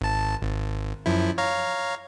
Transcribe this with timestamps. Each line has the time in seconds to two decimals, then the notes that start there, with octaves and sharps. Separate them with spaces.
0.01 G#1 A5
0.43 G#1
1.06 F#2 F3 E4
1.38 C#5 F5 A#5